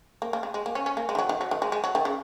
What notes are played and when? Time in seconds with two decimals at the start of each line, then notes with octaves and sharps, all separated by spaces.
0.22 A#3
0.33 A#3
0.43 G#3
0.54 G#3
0.66 A#3
0.75 C#4
0.86 C#4
0.97 A#3
1.09 G#3
1.15 D#3
1.19 F#3
1.29 D#3
1.41 F#3
1.51 D#3
1.62 G#3
1.72 G#3
1.84 F#3
1.95 D#3
2.05 C#3